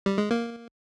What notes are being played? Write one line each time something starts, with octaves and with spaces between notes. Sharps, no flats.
G3
G#3
A#3